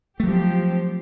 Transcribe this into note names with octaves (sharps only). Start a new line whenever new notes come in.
F3 F#3 A3 C4 G4